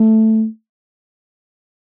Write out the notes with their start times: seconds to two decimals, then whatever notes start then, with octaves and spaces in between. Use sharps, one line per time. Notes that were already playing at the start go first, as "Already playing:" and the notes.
Already playing: A3